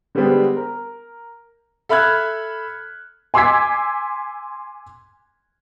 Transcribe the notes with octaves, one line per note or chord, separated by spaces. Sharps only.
D3 G3 G#3 B3 C4 D4
A#4
A4 E5 B5 F6 F#6 G#6
G#5 C6 D6 E6 G#6 B6